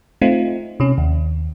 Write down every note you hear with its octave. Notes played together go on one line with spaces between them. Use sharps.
A3 C4 D#4 F4
C3 C#4
D#2